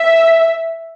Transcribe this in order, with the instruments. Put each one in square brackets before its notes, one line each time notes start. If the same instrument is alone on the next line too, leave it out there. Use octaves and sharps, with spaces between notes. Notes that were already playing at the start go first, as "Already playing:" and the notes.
Already playing: [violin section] E5